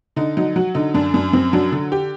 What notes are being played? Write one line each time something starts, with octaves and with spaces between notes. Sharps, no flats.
D3 D#4
F#3 D#4
F#3 F#4
D3 D#4
F#2 D4
F#2 D4
F#2 C4
F#3 D4
D3
G4